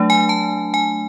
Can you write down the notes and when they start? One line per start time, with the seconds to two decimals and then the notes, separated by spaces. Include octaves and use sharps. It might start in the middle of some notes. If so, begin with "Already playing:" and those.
Already playing: F#3 A3 D4
0.10 G#5
0.29 A5
0.74 G#5